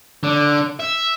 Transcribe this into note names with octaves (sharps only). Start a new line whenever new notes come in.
D3
E5